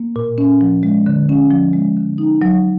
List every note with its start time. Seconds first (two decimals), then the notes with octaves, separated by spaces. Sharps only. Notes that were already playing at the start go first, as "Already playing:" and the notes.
Already playing: A#3
0.16 A#2
0.38 C#4
0.61 F3
0.83 G#3
1.06 D3
1.29 C#4
1.51 F3
1.73 G#3
1.97 D3
2.18 D#4
2.42 F#3